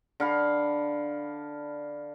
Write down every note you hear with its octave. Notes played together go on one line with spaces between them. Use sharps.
D3 F5 B5